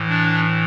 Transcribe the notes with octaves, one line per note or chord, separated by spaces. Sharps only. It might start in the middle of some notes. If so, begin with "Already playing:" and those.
Already playing: A2 E3
D4